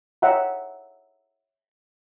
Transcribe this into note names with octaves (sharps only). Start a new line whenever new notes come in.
C#5 D#5 E5 F#5 G5 A#5